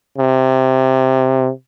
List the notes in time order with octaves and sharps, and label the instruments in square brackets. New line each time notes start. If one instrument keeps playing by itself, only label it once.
[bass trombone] C3